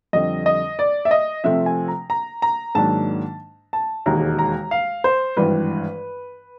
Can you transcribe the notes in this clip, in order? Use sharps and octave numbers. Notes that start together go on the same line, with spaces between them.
F2 D3 G3 D#5
D#5
D5
E5
D#5
C3 F3 A3 C4 E5
G#5
A#5
A#5
A#5
G#2 D#3 F#3 A#3 D4 A5
A5
E1 D#2 D#3 G#3 A#5
A#5
F5
C5
G#1 G2 E3 G3 B4